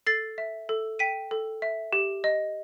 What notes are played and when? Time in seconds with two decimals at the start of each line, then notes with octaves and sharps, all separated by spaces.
0.06 A4 A6 C7
0.38 E5
0.69 A4
0.99 G5 B6 D#7
1.31 A4
1.62 E5
1.93 G4
2.24 D#5